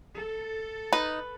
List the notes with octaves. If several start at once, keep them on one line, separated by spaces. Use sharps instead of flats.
A4
D#4 B4